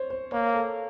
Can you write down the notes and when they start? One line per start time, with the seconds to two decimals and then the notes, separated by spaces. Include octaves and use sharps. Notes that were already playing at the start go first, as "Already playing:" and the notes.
Already playing: C5 C#5
0.10 C5
0.32 A#3 C#5
0.54 A4